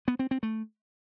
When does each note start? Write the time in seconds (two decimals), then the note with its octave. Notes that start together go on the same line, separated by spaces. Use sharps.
0.08 B3
0.19 C4
0.31 C4
0.43 A3